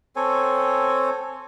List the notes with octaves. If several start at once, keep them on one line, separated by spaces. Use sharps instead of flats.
C4 A4 C#5 G#5